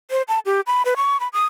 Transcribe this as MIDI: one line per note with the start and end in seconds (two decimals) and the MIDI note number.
0.11 0.22 72
0.28 0.39 81
0.46 0.61 67
0.67 0.82 83
0.85 0.94 71
0.97 1.20 85
1.20 1.28 83
1.33 1.45 87